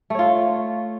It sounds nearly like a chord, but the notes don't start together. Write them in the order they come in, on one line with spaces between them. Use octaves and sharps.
A3 C#5 F4